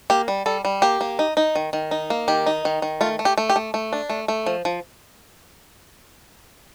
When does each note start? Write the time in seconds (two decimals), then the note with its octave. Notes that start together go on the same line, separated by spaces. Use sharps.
0.10 A#3 G4
0.28 G3
0.46 G3 A4
0.65 G3
0.82 A#3 G4
1.01 A#3
1.19 D#4
1.37 D#4
1.56 D#3
1.73 D#3
1.91 D#4
2.10 A#3
2.28 D#3 G4
2.46 D#4
2.65 D#3
2.82 D#3
3.01 A3 F4
3.19 A3
3.25 G4
3.38 A3
3.50 G4
3.56 A3
3.74 A3
3.93 D4
4.10 A3
4.28 A3
4.46 F3
4.65 F3